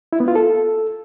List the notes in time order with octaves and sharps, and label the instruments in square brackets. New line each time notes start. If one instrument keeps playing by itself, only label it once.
[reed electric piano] E4
B3
F4
A4